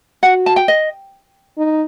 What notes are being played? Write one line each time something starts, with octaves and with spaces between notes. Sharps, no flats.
F#4 F#5
A5
G5
D#5
D#4